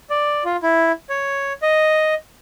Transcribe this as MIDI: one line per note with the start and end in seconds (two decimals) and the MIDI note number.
0.10 0.44 74
0.45 0.56 65
0.63 0.92 64
1.10 1.53 73
1.62 2.14 75